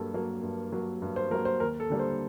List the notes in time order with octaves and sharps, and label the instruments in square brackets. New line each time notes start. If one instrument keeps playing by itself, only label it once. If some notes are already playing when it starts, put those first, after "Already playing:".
Already playing: [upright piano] G2 F#3 A#3 G4 A4
F#3 A#3
G2
F#3 A#3
G2
C5
F#3 A#4
A#3
C5
D#2 A#4
A4
D3 G3 A#3
C5